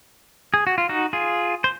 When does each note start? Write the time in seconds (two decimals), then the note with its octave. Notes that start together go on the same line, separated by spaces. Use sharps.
0.54 G#4
0.67 F#4
0.78 F4
0.89 D#4 F#4
1.13 F4 G#4
1.64 C5